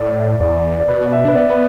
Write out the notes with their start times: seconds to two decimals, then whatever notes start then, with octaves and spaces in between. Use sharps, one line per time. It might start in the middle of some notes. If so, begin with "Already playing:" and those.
Already playing: A2 D5
0.40 E2 D5
0.80 D5
0.88 B2 B4
1.06 D5
1.12 E5
1.25 D4 B4
1.35 B3 D5
1.50 B4